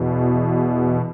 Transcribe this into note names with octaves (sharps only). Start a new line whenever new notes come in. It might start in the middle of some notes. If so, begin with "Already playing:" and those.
Already playing: E2 B2